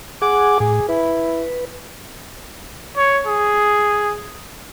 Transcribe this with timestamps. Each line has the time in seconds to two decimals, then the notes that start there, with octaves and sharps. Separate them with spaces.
0.22 G#4 F#5 G#5 D6
0.60 A2 G#4
0.88 E4 B4
2.97 C#5
3.27 G#4